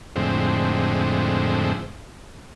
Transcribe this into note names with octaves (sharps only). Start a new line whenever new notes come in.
F2 A2 D3 G#3 C4